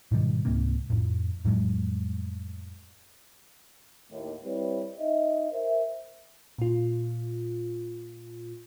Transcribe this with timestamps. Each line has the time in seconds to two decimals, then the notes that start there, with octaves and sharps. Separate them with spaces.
0.11 G#2 B2 D#3 G3
0.45 C#2 G#2 C3 A#3
0.90 F2 A2
1.45 F2 A2 F#3 G#3
4.10 D#2 A2
4.44 G3 C4 E4 B4 C#5
4.99 D#4 D#5 E5
5.52 A#4 C5 E5
6.58 A#2 F4